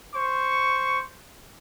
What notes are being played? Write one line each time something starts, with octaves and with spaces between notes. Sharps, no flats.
C5 C#6